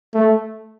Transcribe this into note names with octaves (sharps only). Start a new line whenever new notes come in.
A3